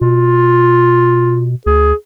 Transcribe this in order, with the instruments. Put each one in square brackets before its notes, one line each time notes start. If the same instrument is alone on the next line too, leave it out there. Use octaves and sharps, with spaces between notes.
[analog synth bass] B2 [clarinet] F4
[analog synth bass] D2 [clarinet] G#4